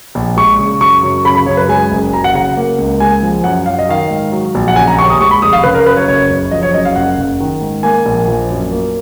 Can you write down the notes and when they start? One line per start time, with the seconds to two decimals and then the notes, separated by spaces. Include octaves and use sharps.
0.15 A#1
0.37 G#3 C#6
0.59 C#3
0.81 F#2 C#6
1.03 F#2
1.25 C#3 B5
1.35 B5
1.46 F#2 C#5
1.57 B4
1.68 G#3 G#5
1.91 F#1
2.12 F#3 A#5
2.24 F#5
2.35 C#3 F#5
2.57 A#3
2.78 C#2
3.00 G#3 G#5
3.23 F3
3.44 F#2 F#5
3.66 F#2 F5
3.79 D#5
3.89 D#3 F5
4.10 G#2
4.32 F#3
4.55 A#1
4.68 F#5
4.76 C#3 G#5
4.87 A#5
4.98 D#2 C#6
5.10 D#6
5.20 G#3 C#6
5.31 B5
5.42 F1 D#6
5.53 F5
5.63 C#3 B4
5.74 A#4
5.86 F#2 B4
5.97 C#5
6.07 F#1 C#5
6.31 F#1
6.51 F3 D#5
6.63 C#5
6.74 F#2 D#5
6.85 F5
6.96 F#1 F#5
7.18 F#1
7.40 D#3
7.61 G#2
7.83 A#3 G#5
8.06 A#1
8.27 F3
8.50 F#2
8.72 A#3